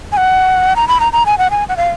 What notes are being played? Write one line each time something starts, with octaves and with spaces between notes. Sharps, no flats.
G#5
F#5
A#5
B5
A#5
A#5
G#5
F#5
G#5
F#5
F5